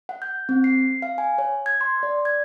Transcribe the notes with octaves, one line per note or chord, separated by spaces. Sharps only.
F#5
G6
C4
C7
F5
G#5
C#5
G#6
C6
D5
G#6